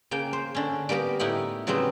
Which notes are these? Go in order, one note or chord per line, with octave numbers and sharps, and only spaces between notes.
C#3 A#3 G5
C5
D3 C#4
G3 A#3 B3 G4 A#4
A2 D#4 E4 G4 F#5
C#3 F#3 G3 B3 C4